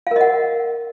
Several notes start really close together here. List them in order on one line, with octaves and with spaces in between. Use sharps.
F5 A#4 D#5 F#5